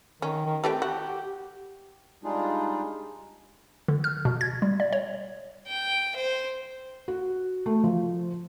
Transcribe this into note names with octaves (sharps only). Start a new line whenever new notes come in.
D#3 C#4
D#3
E3 A3 C4 G4
F#4
G3 G#3 D4 D#4 F4 G#4
D3
F6
B2
G#6
G3
D5
C#5
G5
C5
F#4
A3
F3